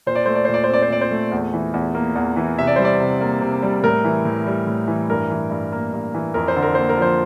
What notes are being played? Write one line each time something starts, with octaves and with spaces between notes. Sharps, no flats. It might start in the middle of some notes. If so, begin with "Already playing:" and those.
A#2 C5
D5
A3 C5
D5
A#2 C5
D5
C5
C4 D5
C5
A#2 D5
C5
A3
E2
E3
E2
A#3
E2
E3
C3 E5
D5
G3 C5
D5
C3
A#3
C3
G3
A2 A#4
E3
A2
G3
A2
E3
G2 A#4
E3
G2
A#3
G2
E3
F2 A#4
C5
D3
A#4
A#3 C5
A#4
F3 C5